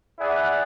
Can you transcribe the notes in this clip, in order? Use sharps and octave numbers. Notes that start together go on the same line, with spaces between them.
E4 G#4 D5 F#5